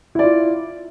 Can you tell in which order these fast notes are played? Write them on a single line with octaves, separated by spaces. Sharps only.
E4 D5 F4